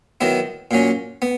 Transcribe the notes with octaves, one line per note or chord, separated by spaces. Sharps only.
D#3 F#3 B3 E4
A#2 F#3 C#4
B3